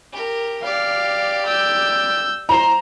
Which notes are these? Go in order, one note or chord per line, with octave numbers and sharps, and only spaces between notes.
G4 A#4
G4 D5 F5
E6 G6
C5 A#5 C6